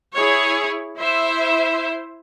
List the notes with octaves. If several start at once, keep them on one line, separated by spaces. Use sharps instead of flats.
E4 G#4 C#5
E4 C5 E5